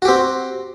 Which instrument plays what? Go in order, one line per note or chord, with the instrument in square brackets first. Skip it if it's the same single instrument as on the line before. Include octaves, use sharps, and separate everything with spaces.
[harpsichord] F#4
G4
C4